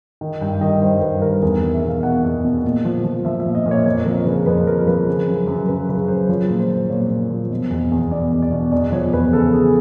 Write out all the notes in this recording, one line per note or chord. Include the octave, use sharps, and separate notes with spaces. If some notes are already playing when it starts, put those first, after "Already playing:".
D#3
G2 G5
D#3 D#5
G2 C5
G2 B4
D#3 A#4
E2 A#4
E2
E5
B2 F5
B2 F#5
E2
B2
A#2
F3
F3
F3 E5
E5
A#2
D#5
A#2
C#5
F2 C#5
F3 A#4
C#3 B4
F2 B4
F3 A#4
F3 B4
C#3
F#2
F#2
C#3 B4
C#3 B4
F#2 C5
F3 C#5
A#2
C5
F3
A#2 C#5
A#2
F3
B2
E2
E2
B2 D5
E2
D5
B2
E2 D5
F3 C#5
E2 B4
C#3 A4
C#3 G#4